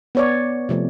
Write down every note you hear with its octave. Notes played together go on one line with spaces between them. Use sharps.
B3 C#5 D5
C3 F3 A3